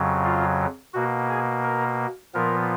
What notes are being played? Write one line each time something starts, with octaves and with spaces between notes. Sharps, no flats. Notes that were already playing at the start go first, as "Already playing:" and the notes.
Already playing: F2 C#3 F#3
F4
B2 A#3 F#4
G#4
A#4
A#2 F3 B3 A#4